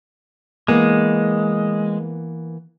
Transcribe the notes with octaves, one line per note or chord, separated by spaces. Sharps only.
E3 G#3 A#3 B3